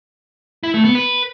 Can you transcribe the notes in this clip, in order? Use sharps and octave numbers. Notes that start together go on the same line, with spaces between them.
E4
A3
B3
B4